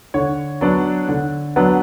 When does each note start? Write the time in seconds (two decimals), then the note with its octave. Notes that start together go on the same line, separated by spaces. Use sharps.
0.14 D3 C#5
0.61 F#3 B3 D4
1.09 D3
1.56 F#3 B3 D4